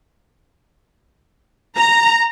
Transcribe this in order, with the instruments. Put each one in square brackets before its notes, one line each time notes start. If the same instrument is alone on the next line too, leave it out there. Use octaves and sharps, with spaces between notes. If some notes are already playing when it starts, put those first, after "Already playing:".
[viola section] A#5